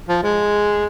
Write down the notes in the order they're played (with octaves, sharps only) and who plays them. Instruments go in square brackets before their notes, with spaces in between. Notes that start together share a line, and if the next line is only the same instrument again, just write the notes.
[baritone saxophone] F3
G#3